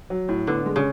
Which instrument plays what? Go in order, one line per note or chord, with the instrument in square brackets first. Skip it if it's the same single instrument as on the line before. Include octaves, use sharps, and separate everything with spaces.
[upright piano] F#3
A2
[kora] D3 [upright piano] B3
[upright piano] G#3
[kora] C#3